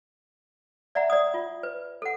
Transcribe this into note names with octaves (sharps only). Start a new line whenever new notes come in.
D5 E5 F#5 A#5
D5 D#6
F4
B4
A4 F#5